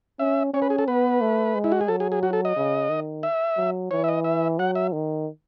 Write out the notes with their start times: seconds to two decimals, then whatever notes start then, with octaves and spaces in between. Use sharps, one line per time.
0.19 C#4 E5
0.53 C#4 C#5
0.62 B4
0.70 G#4
0.78 A4
0.88 B3 B4
1.21 A3
1.55 G#3
1.64 E4
1.72 F#4
1.81 G#4
1.88 F#3 A4
2.00 G#4
2.12 G#4
2.23 F#4
2.33 A4
2.45 D#5
2.56 C#3
2.89 D#3
3.23 E5
3.57 F#3
3.91 E3 C#5
4.04 E5
4.08 D#5
4.24 E5
4.59 F#3 F#5
4.75 E5
4.92 D#3